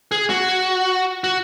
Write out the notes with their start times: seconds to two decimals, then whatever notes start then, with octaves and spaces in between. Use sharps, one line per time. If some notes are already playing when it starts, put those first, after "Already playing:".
0.12 G#4
0.30 F#4
1.24 F#4